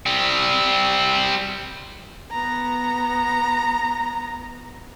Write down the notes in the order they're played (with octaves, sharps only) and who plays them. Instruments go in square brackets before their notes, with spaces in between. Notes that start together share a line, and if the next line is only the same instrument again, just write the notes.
[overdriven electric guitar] G3 C4
[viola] B3 A#5